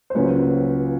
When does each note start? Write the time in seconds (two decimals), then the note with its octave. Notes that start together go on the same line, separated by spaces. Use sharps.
0.10 C5
0.15 C#2 C#3 F#3 A#3 C#4 B4 C#5